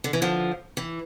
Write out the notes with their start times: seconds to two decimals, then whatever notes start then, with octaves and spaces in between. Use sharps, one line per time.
0.04 D3
0.13 E3
0.22 D3 F3
0.77 E3